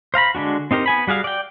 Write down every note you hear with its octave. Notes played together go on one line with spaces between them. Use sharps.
C5 F5 A#5 B5
D3 G#3 D4 F#4
C4 D#4 G4 A#4 C5
B3 G#5 B5
G3 F#4 G#4 F5
D5 G5